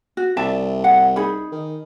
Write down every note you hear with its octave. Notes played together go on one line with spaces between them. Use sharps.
F#4
C2 D5 E5 A5
F#5
D#4 G#4 B5
D#3